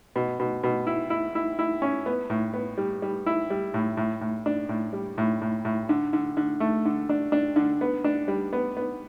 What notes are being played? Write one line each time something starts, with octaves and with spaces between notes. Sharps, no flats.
B2
B2
B2
E4
E4
E4
E4
C#4
B3
A2
B3
G3
G3
E4
G3
A2
A2
A2
D4
A2
G3
A2
A2
A2
D3
D3
D3
A3
D3
D4
D4
D3
B3
D4
G3
B3
B3